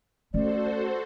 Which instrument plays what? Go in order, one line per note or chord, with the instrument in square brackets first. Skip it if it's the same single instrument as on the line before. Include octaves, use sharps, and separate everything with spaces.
[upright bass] A3 C#4 [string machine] F#4 A4 C5 [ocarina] D5